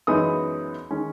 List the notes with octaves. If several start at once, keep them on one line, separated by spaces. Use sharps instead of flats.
F#2 E3 G#3 B3 D#4 D#6
D#3 G#3 C#4